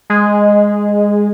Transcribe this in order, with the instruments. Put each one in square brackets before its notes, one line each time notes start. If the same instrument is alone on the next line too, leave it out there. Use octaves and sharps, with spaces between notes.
[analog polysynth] G#3